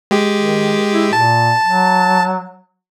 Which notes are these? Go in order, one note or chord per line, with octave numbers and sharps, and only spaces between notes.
G#3 G4
D#3
E4
A#2 A5
F#3